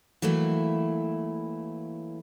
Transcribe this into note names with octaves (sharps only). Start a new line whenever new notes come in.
E3 F#3 A3 A#3 E4